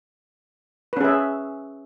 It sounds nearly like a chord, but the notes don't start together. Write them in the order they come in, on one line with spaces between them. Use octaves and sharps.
B4 C#4 G#4 E5